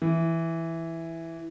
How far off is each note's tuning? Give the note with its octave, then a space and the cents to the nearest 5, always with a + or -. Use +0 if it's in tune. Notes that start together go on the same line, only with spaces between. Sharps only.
E3 +0